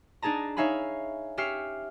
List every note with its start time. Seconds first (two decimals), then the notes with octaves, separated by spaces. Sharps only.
0.22 D4 D#4 G#4 A5 A#5
0.57 D#4 C#5 E5 F5 G#5 B5
1.37 C#4 G4 E5 F6 C7 C#7